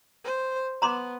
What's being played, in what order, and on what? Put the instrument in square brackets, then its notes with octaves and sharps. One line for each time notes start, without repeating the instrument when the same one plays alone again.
[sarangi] C5
[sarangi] B3 [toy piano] A#5 C6 D6